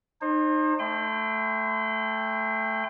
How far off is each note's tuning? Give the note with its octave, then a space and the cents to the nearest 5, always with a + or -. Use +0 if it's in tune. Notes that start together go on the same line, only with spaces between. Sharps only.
D#4 -25 C5 +30
A3 +0 G5 +25 C6 -40